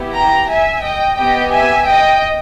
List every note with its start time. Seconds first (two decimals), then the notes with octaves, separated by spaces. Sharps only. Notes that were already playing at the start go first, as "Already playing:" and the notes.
Already playing: B3 E4 G4
0.13 G5 A#5
0.49 E5 G#5
0.83 D#5 G5
1.18 B3 G4 D#5 G5
1.52 E5 G#5
1.87 D#5 G5